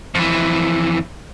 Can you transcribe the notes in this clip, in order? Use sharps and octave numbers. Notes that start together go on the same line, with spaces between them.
F2 E3